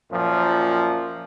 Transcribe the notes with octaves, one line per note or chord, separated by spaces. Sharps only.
F#2 A#2 F3